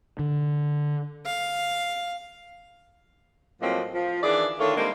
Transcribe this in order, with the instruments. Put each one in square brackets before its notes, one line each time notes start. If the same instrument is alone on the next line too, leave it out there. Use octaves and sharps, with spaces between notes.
[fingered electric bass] D3
[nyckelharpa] F5
[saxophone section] A2 F3 F#3 G#3 A#3 C4
F3
D#3 E3 D4 E4 G#4 D5
D3 D#3 A3 F4 A#4 C#5
G3 G#3 A#3 C4 D4 D#4